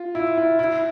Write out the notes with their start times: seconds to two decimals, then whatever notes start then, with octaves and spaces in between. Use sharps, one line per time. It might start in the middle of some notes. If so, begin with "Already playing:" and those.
Already playing: F4
0.15 E4
0.37 E4
0.59 E4